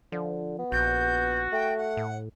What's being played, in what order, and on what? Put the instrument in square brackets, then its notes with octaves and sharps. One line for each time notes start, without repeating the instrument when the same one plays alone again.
[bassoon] D3 [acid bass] F3
[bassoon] B3
[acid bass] A#1 [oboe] F#4 [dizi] G6
[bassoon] A3 [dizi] G5
[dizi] F#5
[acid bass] A2